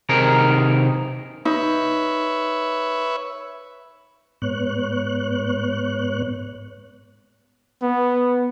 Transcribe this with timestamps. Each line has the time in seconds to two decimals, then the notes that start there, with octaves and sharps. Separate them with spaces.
0.09 C3 D#3 D#4 G#4 A#4
1.45 D#4 B4 C#5 E5
4.42 G#2 B3 C#5 F#6
7.82 B3